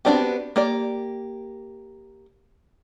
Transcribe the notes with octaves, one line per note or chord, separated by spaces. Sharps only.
B3 C4 D4 F#4 G4
A#3 G4 D5